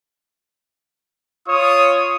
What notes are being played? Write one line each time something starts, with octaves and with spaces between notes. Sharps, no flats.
F4 C#5 C#6 D#6